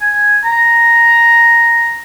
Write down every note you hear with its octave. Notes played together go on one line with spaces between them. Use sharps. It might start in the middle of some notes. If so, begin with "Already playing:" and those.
G#5
A#5